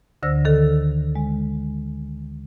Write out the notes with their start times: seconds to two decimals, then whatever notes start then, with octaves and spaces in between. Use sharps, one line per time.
0.23 D2 D3 C5 E6 A#6
0.45 D#3 A4
1.15 G#3